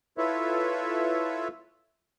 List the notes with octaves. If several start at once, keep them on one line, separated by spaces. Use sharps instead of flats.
E4 F4 A4 B4 C#5 E5